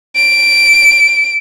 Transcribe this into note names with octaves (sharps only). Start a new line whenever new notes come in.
D7